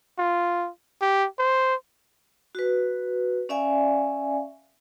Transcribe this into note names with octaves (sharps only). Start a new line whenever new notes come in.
F4
G4
C5
F#4 B4
C#4 D5 E5 F5 G#5